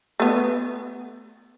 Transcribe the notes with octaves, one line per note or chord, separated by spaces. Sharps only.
A3 B3